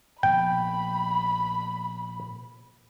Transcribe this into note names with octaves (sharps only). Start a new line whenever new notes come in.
A#2 F3 B3 G5 B5